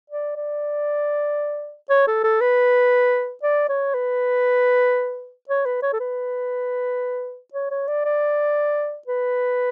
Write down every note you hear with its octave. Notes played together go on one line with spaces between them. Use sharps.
D5
D5
C#5
A4
A4
B4
D5
C#5
B4
C#5
B4
C#5
A4
B4
C#5
C#5
D5
D5
B4